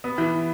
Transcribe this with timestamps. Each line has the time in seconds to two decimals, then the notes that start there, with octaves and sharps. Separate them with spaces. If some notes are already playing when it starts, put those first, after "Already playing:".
0.04 B3
0.18 E3